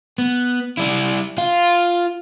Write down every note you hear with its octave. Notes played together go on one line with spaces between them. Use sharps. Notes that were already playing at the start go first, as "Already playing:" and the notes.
B3
G3 E4
F4 F5